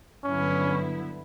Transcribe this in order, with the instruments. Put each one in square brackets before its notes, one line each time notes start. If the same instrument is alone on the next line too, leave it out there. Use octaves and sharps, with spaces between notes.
[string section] G2 D3 F#3 B3 E4 [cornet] C#4